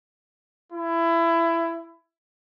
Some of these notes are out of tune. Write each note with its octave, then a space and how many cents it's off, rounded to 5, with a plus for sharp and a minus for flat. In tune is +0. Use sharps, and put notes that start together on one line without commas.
E4 +20